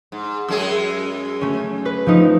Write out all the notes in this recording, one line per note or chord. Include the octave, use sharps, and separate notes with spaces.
G#2
F#2 G#3 G#4 E6
A3 C#4
B4
F3 A3 D#4